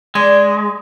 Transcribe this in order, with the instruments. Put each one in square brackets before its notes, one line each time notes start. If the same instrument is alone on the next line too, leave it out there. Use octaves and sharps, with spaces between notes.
[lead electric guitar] G#3 [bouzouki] D4